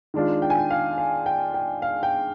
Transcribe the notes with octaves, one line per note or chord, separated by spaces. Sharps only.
D#3 G#3 D4 F4
G5
G#5
G5
F5
F5
G5
G5
F5
G5